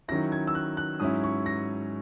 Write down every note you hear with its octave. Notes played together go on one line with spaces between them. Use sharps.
D#3 F#3 C#4 E4 A#6
G#6
E6
F#6
F#6
G#2 F#3 C#4 E4 D#6
C#6
A#6